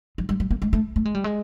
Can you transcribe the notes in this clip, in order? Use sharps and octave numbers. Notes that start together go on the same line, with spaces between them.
F3
G3
G3
A#3
G#3
A3
A3
G#3
G3
G#3